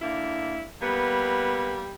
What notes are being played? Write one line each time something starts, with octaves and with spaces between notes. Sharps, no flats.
D3 A#3 E4
G3 A#3 B3